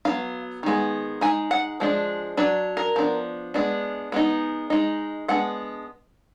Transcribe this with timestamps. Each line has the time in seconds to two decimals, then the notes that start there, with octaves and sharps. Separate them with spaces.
0.05 F#3 B3 D#4 F5
0.63 D#3 G#3 B3
1.21 G#3 D#4 G#5
1.51 F#5
1.80 F3 G#3 D4
2.37 F#3 D4 B4
2.77 A#4
2.96 F3 B3 D4
3.54 G#3 B3 D4
4.12 G#3 B3 D#4
4.70 G#3 D#4
5.28 G#3 B3 D4 F#5